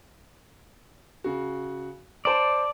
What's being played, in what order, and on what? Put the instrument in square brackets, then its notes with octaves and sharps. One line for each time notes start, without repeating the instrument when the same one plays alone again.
[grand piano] C#3 F#4
[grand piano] C5 A5 D7 [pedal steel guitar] D5